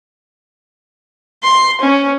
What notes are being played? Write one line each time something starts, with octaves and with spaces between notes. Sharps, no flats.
C6
C#4